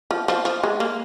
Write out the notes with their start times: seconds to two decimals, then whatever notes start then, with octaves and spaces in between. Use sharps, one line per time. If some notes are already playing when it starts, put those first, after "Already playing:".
0.11 F3
0.28 F3
0.45 F3
0.63 G#3
0.80 A#3